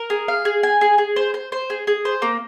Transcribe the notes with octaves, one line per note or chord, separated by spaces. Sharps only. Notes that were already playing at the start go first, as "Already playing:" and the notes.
Already playing: A#4
G#4
F5
G#4
G#5
G#4
G#4
C5
C5
C5
G#4
G#4
C5
A#3